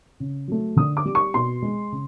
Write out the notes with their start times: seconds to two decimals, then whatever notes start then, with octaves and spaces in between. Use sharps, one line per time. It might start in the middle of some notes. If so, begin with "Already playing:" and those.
0.20 C#3
0.48 F#3 A3
0.76 D3 D#6
0.97 D6
1.05 G3
1.15 C#6
1.34 B2 C6
1.62 G#3
1.92 C#3